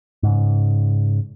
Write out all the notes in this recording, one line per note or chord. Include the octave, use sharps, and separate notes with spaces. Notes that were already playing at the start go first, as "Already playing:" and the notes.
G#2 C#3